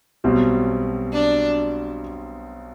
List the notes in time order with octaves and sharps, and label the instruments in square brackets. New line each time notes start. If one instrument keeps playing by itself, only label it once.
[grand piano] B1 B2 G3 C4
[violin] D4